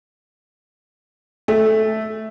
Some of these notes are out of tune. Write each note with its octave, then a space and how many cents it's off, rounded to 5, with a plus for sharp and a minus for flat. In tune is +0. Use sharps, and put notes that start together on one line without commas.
A3 -10